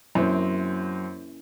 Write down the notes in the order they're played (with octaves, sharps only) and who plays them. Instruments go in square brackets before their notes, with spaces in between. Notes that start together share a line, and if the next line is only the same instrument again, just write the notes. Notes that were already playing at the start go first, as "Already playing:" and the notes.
[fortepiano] F#2 C4 [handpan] A#3 C#4 E4